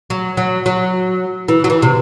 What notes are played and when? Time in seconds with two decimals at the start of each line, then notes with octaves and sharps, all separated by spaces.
0.10 F#3
0.37 F#3
0.66 F#3
1.48 E3
1.64 F#3
1.70 E3
1.82 C3